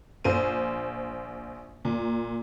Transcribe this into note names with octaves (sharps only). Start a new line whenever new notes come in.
A#1 C5 D#7
A#2